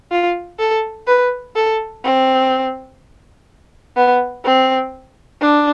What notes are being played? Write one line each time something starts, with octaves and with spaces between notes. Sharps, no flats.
F4
A4
B4
A4
C4
B3
C4
D4